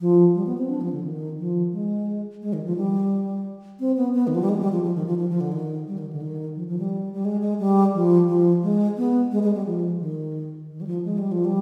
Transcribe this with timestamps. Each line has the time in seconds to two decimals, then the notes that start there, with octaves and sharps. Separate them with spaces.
0.01 F3
0.35 G3
0.47 B3
0.58 C4
0.69 D4
0.81 F3
0.92 D3
1.04 D#3
1.39 F3
1.73 G#3
2.42 G#3
2.53 D#3
2.65 F3
2.77 G3
3.80 C4
3.97 B3
4.14 B3
4.27 D#3
4.35 F3
4.42 G3
4.49 G#3
4.60 G3
4.72 F3
4.84 F3
4.95 D#3
5.06 F3
5.18 F3
5.30 F3
5.41 D3
5.52 D#3
5.87 G3
5.98 D#3
6.12 D3
6.22 D#3
6.56 F3
6.68 F3
6.79 G3
7.13 G3
7.25 G#3
7.42 G#3
7.59 G3
7.94 F3
8.28 F3
8.63 G#3
8.97 B3
9.32 G#3
9.43 G#3
9.55 G3
9.66 F3
10.00 D#3
10.70 D#3
10.81 G3
10.87 F3
11.05 G#3
11.18 G3
11.32 F3
11.45 G3